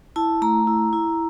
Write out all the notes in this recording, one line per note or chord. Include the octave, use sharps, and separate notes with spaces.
E4 A5
A3 A#5
E4
E4